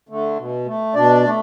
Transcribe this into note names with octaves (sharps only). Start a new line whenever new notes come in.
D3 A3
B2
A3
B2 D4 D5
A3